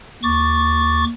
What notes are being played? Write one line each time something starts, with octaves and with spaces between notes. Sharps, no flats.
D#2 C#6 D6 A6